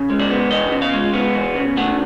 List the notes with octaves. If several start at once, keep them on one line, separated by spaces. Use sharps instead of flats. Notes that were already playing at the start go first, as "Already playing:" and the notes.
Already playing: C#3
G#3
D5
B3
E3 D#5
C#3
F5
G#3
B3
E3
C#3
A3 F#5